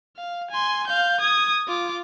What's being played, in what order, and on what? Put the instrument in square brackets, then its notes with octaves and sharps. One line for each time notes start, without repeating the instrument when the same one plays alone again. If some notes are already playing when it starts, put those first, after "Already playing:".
[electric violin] F5
G#5 C6
F5 G6
D#6 G#6
F4 D6